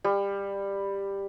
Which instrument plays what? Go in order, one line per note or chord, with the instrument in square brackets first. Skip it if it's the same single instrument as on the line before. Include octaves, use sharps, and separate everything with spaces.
[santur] G3